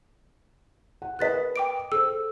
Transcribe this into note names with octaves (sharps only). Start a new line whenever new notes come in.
F#5
A#4 B4 D#5 F#6 A6 B6
G5 D6 D7
A4 C5 E6